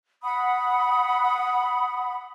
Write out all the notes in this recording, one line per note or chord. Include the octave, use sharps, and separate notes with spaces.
F#5 B5 D#6